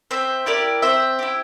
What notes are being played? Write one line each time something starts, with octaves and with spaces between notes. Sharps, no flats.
C4 C5 E5
E4 G4 A#4 D5
C4 C5 E5
E4 G4